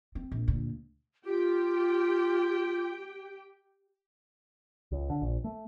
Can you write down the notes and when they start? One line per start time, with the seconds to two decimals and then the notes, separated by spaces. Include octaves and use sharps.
0.15 C4
0.32 A#1
0.48 D2 A#2
1.25 F4 G4 G5
4.92 C#2
5.10 D3
5.22 A#1
5.44 A3